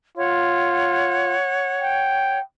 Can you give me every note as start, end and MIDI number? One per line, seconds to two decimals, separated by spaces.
0.17 1.35 65
0.17 2.39 73
0.17 2.39 78
1.82 2.42 79